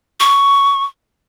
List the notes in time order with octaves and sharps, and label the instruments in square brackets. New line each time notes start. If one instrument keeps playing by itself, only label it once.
[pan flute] C#6